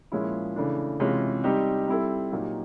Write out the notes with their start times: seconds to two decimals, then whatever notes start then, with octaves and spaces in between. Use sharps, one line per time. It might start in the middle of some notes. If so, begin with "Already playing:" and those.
0.12 A#2 F3 G#3 C#4 E4
0.56 C#3 E3 A3 D4
1.00 C3 E3 G#3 C#4 F4
1.44 G3 C4 D#4 G4
1.88 G3 C4 E4 A4
2.32 A#2 F#3 A#3 D#4 G4